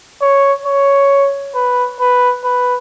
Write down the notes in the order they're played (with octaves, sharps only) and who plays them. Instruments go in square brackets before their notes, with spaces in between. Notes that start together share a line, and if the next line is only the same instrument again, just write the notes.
[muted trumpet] C#5
C#5
B4
B4
B4